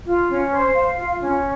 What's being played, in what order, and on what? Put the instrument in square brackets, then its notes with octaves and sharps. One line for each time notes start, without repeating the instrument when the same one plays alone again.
[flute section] F4
C#4
C5
F5
F4
C#4